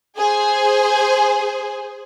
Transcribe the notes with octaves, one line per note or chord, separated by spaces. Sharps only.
G#4 C5